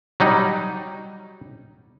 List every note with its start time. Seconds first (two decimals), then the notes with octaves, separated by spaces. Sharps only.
0.20 F#3 G3 D#4